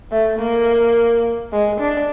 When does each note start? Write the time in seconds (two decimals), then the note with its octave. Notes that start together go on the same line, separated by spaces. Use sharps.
0.12 A3
0.39 A#3
1.52 G#3
1.80 D4